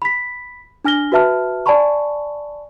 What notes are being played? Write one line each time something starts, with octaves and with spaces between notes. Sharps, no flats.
B5 B6
D4 G#5 F6 A#6 G7
F#4 B4 E5 A5 F6
D5 G#5 A5 B5 C#6